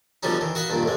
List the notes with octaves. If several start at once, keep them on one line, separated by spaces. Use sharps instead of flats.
B2 D3 F3 G3 C#4 D#4
D#3 E3
F#4 D#5 F5 B5
G2 A#2 D#3
A1 A2 G#3